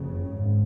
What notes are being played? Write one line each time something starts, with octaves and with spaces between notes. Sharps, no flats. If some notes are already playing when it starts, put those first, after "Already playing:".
Already playing: F#1 F2 C#3
G#1 G#2